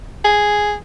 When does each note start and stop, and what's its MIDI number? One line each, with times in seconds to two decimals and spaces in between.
0.24 0.74 68